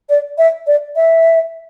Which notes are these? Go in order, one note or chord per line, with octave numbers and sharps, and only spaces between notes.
D5
E5
D5
E5